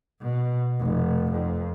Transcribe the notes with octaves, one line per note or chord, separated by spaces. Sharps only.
B2
F1
F2